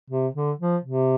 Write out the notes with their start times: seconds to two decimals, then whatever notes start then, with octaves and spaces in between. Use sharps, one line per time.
0.10 C3
0.35 D3
0.60 F3
0.84 C3